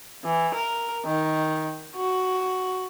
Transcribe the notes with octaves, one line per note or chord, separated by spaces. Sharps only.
E3
A#4
D#3
F#4